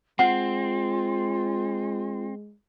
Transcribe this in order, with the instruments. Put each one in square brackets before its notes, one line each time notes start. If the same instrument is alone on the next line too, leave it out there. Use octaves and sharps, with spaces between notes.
[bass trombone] G#3 [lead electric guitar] C4 [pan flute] F4 [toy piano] F#5